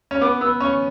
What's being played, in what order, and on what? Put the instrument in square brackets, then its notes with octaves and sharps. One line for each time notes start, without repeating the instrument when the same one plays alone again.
[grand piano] C#4
[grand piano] B3 [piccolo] D6
[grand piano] B3 [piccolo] E6
[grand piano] C#4 [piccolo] C#6